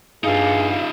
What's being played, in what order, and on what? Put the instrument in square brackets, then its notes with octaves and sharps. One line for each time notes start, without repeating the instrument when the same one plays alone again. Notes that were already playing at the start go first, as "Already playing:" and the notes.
[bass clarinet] G2 [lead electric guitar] D#4 F4 [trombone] G#4 [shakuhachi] F5